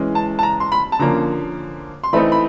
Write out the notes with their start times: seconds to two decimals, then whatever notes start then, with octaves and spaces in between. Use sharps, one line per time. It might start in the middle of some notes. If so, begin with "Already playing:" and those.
Already playing: E3 G#3 C#4
0.15 A5
0.39 A5
0.43 A#5
0.60 C6
0.72 B5
0.92 A5
0.99 D3 F3 A#3 C#4 A#5
2.04 C6
2.13 E3 A3 C4 D#4 B5
2.32 B5